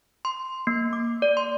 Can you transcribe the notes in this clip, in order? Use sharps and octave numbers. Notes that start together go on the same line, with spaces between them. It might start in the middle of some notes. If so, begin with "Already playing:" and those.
C6
A#3
D6
D5
C6